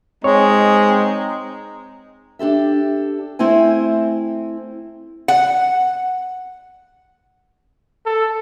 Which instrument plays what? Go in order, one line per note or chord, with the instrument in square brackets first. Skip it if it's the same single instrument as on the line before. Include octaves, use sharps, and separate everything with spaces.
[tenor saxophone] G#3 [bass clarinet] C4 [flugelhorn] D#4 [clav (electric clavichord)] C#5
[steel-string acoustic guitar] D4 G4 A4 E5
A3 C4 E4 C5 G#5
[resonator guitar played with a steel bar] F#5
[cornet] A4